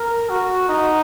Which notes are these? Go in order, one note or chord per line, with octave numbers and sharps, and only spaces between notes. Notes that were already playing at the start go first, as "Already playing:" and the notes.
Already playing: A#4
F#4
D#4